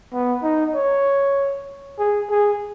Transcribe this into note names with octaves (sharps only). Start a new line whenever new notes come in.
B3
D#4
C#5
G#4
G#4